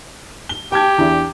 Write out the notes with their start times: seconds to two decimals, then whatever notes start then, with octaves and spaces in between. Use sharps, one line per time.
0.49 G7
0.72 G4 G5 A5 G#6
0.98 E2 D4 E4